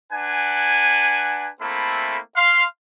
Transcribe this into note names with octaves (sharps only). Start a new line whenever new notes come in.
D4 B4 F#5 G#5
A3 A#3 C4 E4 A4 B5
F5 C6